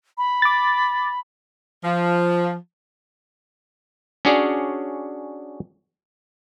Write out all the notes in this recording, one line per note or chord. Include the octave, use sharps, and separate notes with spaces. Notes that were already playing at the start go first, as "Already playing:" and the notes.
B5
D6 A6
F3
C#4 D4 F#4 G#4 C#5 D5